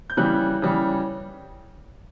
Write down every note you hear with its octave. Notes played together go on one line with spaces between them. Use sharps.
G6
C#3 E3 G3 F#6
C#3 E3 G3